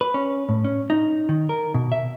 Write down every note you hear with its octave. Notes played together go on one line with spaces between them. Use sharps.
B4
C#4
A2
C#4
D#4
D#3
A#4
B2
E5